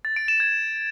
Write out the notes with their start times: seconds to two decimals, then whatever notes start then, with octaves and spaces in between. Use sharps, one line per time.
0.05 A6
0.16 D7
0.28 E7
0.40 G#6